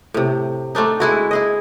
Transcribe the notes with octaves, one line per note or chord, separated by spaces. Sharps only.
A2 C3
A3 C4 D4 D#4
G#3 E4 F#4
E4 G#4 D#5